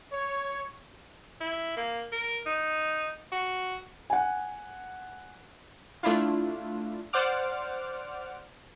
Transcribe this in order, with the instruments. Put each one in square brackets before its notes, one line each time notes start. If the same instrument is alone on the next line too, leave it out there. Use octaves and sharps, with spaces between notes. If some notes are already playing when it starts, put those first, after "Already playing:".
[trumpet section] C#5
[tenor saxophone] E4
A#3
A#4
D#4
F#4
[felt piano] F#5 G#5
[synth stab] A3 D4 E4 F4
C5 D5 F#5 D6 F6